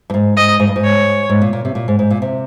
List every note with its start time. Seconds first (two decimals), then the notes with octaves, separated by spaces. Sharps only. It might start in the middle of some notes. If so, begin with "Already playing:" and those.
0.10 G2
0.14 G#2
0.37 G#2 D#5
0.60 G#2
0.67 G2
0.76 G#2
0.83 C#5
1.29 G#2
1.41 A#2
1.53 A#2
1.65 C3
1.75 A#2
1.88 G#2
1.99 G#2
2.10 A#2
2.22 C3